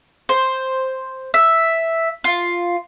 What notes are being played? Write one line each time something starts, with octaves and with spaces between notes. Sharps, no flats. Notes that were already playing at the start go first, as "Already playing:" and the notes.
C5
E5
F4